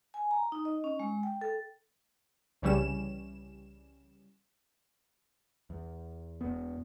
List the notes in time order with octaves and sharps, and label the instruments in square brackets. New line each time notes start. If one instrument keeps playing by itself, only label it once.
[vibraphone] G#5
A#5
D#4
D#5
C#4
G#3
G5
A4
[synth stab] C2 C#3 E3 G3 C#4 E7
[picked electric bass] E2
E1 B3